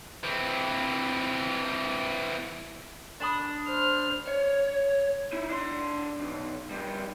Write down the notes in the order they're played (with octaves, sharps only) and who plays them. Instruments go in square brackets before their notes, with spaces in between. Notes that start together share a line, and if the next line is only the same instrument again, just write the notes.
[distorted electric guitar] E3 C4
[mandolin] D4 B5 D#6
[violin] C5 F6
[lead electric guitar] C#5
D#4 E4
D4 C6
B1
F2 G3